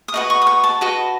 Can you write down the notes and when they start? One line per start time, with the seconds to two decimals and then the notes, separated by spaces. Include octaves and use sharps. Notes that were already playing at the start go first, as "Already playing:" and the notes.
0.08 D#6
0.14 F#4 B4 D#5 C#6
0.30 C#6
0.42 D#6
0.47 C#6
0.64 A5
0.81 F#4 B4 D#5